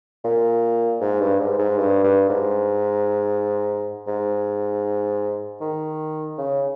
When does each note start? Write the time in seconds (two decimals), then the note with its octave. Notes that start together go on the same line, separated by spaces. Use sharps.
0.24 A#2
1.01 G#2
1.20 G2
1.40 G#2
1.59 G#2
1.77 G2
2.04 G2
2.29 G#2
4.07 G#2
5.61 D#3
6.38 C#3